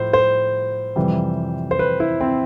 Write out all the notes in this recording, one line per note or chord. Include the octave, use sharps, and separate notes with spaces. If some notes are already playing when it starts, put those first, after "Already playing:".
Already playing: A2 F3 C5
C5
F2 C3 E3 G3
C5
B4
E4
C4